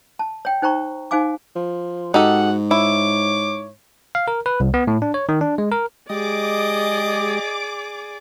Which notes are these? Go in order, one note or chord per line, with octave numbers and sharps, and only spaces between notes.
A5
C#5 G5
D#4 C5 G5 A#5 C#6
D#4 C5 F5 G#5 D6
F3
G#2 D#4 F#4 G4 A4 F#5
E4 C#5 D6
F5
A#4
B4
C2
B3
A2
D4
C#5
D#3
D4
G#3
A#4
G#3 G4 G#4 D5 D#5 D6